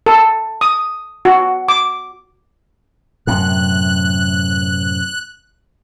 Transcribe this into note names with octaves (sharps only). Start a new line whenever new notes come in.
A4
D#6
F#4
D6
F#2 A2 C3 F#6